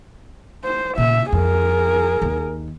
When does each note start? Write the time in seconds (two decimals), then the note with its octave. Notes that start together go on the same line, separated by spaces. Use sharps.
0.65 C5
0.98 A#2 C#3 E5
1.32 F2 G#4 A#4
2.22 D#2